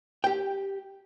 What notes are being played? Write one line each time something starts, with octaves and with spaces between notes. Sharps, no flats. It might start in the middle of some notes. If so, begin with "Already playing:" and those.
G4 G5